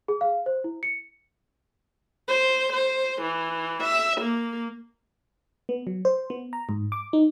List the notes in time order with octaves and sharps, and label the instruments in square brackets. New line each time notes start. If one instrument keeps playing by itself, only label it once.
[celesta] G#4
F5
C5
E4
C#7
[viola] C5
C5
E3
E5
A#3
[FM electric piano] B3
F#3
C5
B3
A#5
G#2
D6
D#4